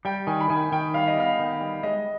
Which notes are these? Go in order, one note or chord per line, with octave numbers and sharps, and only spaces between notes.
G3 G5
D#3 G#5
B5
D#3 G#5
D#3 G5
G3 F5
D#5
B3 F5
D#3
G3
G#3 D#5